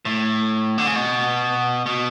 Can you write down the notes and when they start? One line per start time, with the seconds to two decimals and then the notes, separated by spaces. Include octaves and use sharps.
0.05 A2
0.78 D3
0.86 C#3
0.96 B2
1.86 B2